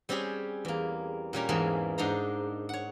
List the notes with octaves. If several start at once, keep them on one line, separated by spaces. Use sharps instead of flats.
G3 C4 C#4 G4 G#4 C#5
E2 A#3
A#2 G3 C#4 A#4
E2 G#2 E3 G#3 A#3 A5
G#2 D4 D#4 C5 A#5
C#5 F#5